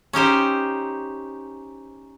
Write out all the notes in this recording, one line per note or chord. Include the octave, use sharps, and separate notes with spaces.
C#4 D#4 G4 C5